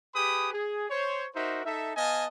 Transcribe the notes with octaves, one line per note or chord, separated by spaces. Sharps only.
G4 G#4 B4 B5 D#6
G#4
C5 C#5
D#4 F#4 A#4 C5 E5
D#4 A4 E5
B3 D#5 F5 G#5 A5